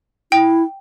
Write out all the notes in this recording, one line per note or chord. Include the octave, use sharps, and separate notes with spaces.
E4 G5